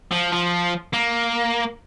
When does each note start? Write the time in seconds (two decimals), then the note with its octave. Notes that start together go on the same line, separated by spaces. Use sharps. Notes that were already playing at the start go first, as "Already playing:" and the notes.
0.12 F3
0.33 F3
0.93 A#3